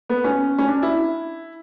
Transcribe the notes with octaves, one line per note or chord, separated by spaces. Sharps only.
B3
C#4
C#4
D4
E4